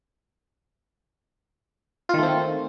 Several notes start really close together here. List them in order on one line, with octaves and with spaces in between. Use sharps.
F4 D#3 A3 C4